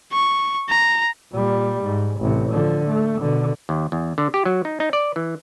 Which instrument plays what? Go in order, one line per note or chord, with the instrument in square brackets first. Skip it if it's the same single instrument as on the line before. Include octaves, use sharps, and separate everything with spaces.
[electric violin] C#6
A#5
[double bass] A#2 G3
G#2
A1 C3
D3 F3
A3
B2 D3
[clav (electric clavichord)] D#2
E2
D3
G4
F#3
D#4
D#4
D5
E3